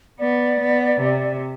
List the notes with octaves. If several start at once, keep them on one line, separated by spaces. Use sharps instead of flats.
B3 D5
B3
C3